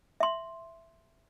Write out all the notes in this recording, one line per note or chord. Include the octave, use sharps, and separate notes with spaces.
E5 C6